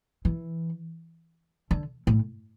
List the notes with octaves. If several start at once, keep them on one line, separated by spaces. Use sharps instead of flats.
E3
D3
A2